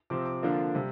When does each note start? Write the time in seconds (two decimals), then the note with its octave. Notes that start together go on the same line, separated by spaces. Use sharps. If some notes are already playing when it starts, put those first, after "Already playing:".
0.10 C3 F3 C4 D6
0.26 D6
0.42 D3 F3 A#3 D4 F4
0.75 C3 G3